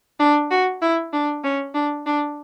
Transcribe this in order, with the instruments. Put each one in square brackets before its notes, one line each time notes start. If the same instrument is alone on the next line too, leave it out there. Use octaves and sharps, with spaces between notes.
[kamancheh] D4
F#4
E4
D4
C#4
D4
D4